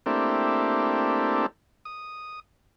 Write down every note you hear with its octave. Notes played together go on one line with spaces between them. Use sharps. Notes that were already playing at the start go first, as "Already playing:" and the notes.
A3 A#3 C4 D4 E4 G4
D#6